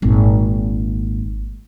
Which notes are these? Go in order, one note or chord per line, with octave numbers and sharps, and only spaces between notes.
G#1 A#2